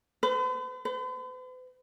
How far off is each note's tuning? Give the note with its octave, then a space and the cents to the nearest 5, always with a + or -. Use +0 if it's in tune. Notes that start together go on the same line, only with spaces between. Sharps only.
B4 +45
B4 +45